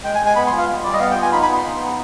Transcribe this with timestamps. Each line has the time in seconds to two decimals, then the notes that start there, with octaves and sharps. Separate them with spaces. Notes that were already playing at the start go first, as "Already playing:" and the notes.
0.04 G#3 G5
0.15 G#5
0.20 G#3
0.26 G#5
0.36 B3 B5
0.47 C6
0.52 F4
0.58 F5
0.67 G3
0.83 G3 D5
0.93 D#5
0.99 B3 F5
1.11 G5
1.15 F4
1.22 G#5
1.32 D#4 B5
1.43 B5
1.48 B3
1.53 C6
1.64 D#4
1.80 B3